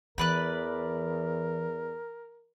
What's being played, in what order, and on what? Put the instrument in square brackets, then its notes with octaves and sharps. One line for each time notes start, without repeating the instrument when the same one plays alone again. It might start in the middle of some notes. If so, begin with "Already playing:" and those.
[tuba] E2 [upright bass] E3 [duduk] A#4 [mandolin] B4 D5 F#6